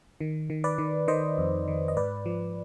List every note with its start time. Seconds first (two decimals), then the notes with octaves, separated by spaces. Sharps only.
0.21 D#3
0.50 D#3
0.64 B4 D5
0.78 D#3
1.08 D#3 C5 D#5
1.38 F2
1.68 D#3
1.88 D#5
1.96 G#2 B4 D5
2.26 F3